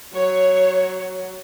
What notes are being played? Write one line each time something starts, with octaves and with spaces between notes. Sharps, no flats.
F#3 C#5